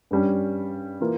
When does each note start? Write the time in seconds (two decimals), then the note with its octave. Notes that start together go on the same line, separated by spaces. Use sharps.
0.11 G2 G3 C#4
1.01 E3 A#3 F4